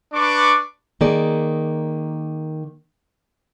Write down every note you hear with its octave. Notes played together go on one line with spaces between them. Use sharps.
D4 B4 D5 C#6 D6
D#3 A#3 G#4 D5